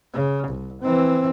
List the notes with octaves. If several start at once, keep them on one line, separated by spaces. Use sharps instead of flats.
C#3
C2
E3 C4